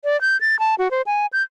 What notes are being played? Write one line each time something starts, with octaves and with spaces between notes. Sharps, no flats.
D5
G6
A6
A5
F#4
C5
G#5
G6